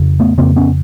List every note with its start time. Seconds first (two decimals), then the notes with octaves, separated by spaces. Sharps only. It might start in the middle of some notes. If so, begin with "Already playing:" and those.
Already playing: F2 C#3
0.19 A3 B3
0.38 F2 C#3 A#3 C4
0.56 B3 C#4